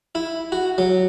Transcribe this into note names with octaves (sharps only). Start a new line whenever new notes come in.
E4
F#4
F#3